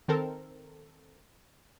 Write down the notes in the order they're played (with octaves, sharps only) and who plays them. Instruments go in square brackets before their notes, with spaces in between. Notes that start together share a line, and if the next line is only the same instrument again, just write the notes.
[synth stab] D#3 C4 A4 A#4